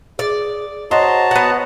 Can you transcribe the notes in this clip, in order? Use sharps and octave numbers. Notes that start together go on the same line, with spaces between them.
G#4 D5
F#4 C5 C#5 D#5 A5 A#5
B3 F#5